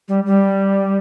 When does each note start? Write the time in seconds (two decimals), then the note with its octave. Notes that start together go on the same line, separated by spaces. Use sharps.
0.08 G3
0.26 G3